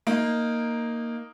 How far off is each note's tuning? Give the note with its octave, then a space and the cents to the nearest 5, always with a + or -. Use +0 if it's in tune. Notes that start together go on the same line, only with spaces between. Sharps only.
A#3 +0 D#4 +0